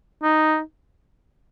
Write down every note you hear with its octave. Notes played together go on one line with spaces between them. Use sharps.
D#4